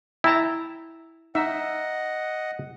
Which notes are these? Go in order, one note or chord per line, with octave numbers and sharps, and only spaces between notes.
E4 G5 A5 A#5
D#4 D#5 E5 F#5